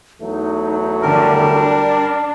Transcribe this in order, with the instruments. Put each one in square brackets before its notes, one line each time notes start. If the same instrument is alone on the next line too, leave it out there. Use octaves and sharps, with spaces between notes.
[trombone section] E2 F#3 A3 [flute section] D#4
[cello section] D3 [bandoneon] G3 A#4 [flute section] A5
[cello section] D4